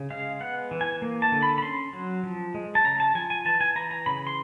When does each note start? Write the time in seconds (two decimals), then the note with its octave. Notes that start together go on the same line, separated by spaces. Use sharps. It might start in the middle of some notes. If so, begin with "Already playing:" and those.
Already playing: C#3
0.10 G#3 F5
0.41 B3 F#5
0.71 E3
0.81 G#5
1.02 A#3
1.22 A5
1.32 D3
1.43 B5
1.58 B5
1.63 C#4 C6
1.93 F#3
2.23 F3
2.54 G#3
2.75 A5
2.84 C#3 A#5
3.00 A5
3.15 F3 G#5
3.30 G#5
3.45 E3 A5
3.61 G#5
3.76 E3 A#5
3.91 A#5
4.06 C#3 B5
4.27 C6